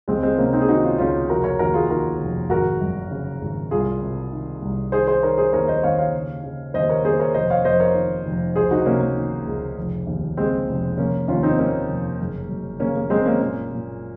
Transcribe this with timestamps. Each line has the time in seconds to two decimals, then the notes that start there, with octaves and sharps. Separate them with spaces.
0.08 C#2 G#3 C4
0.23 G#3 C4
0.38 C3 A#3 C#4
0.53 C4 D#4
0.61 G#4
0.68 D#3 D#4 F#4
0.84 C#4 F4
0.98 C#2 C#4 F4
1.29 F1 F#4 A#4
1.44 A#4 C#5
1.59 D#2 F#4 A#4
1.74 F4 G#4
1.89 D#3 F#4 A#4
2.21 F1
2.50 G#1 F#4 A#4
2.81 F#2
3.11 C#3
3.42 G#1
3.71 C2 F4 G#4
4.01 C3
4.33 D#3
4.62 C2
4.92 D#3 G#4 C5
5.07 G#4 C5
5.23 D#3 A#4 C#5
5.38 G#4 C5
5.53 D#2 A#4 C#5
5.68 C5 D#5
5.83 D#2 C#5 F5
5.99 C#5 F5
6.13 C#3
6.43 C#3
6.74 D#2 C5 D#5
6.90 A#4 C#5
7.04 D#2 G#4 C5
7.20 A#4 C#5
7.34 F1 C5 D#5
7.50 C#5 F5
7.65 F2 C5 D#5
7.80 A#4 C#5
7.95 D#3
8.26 F1
8.56 C#2 G#4 C5
8.71 D#4 F#4
8.86 C3 A#3 C#4
9.01 A#3
9.16 D#3
9.47 C#2
9.77 F1
10.07 D#2
10.37 C#3 G#3 C4
10.69 F1
10.98 F1 A#3 C#4
11.28 D#2 C#4 F4
11.43 C4 D#4
11.58 D#3 A#3 C#4
11.89 F1
12.20 F#1
12.49 F#2
12.80 C#3 A#3 C#4
12.96 A#3
13.10 F#1 G#3 C4
13.25 A#3 C#4
13.40 A#2 A#3 C#4
13.71 A#2